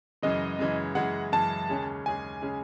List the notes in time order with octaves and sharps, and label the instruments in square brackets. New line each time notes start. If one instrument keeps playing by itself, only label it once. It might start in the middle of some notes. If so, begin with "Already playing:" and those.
[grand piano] F#2 C#3 E3 G#3 [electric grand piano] D#5
[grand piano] F#2 C#3 E3 G#3
[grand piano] F#2 C#3 E3 G#3 [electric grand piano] F#5
[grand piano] F#2 C#3 E3 G#3 [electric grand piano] A5
[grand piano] D#2 C#3 G#3 C#4 G#4
[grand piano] D#2 C#3 G#3 C#4 G#4 [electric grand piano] G#5
[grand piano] C#3 G#3 C#4 G#4